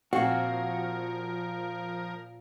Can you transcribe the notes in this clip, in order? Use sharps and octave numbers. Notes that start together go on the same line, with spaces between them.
A#2 F3 C4 F#4 A#4 F5 G#5